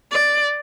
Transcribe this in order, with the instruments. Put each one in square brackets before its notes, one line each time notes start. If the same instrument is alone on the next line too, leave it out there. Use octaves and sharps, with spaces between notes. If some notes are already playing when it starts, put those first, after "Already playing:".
[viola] D5